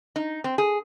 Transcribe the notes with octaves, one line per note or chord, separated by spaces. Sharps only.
D#4
C4
G#4